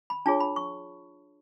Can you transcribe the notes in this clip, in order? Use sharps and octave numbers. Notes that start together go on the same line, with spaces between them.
B5
D4 F4 G#4 C#5 A5
B5
C#6